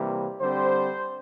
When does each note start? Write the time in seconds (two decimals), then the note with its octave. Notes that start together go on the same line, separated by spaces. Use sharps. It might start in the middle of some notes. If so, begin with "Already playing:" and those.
Already playing: C3 E3 G3 A#3
0.40 D3 G3 C4 C5